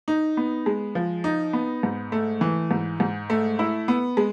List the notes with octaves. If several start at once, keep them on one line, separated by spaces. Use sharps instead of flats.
D#4
B3
G#3
F3
D#4
B3
G#2
A3
E3
G#2
G#2
A3
E4
B3
G#3